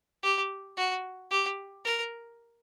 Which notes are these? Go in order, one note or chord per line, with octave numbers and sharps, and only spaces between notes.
G4
F#4
G4
A#4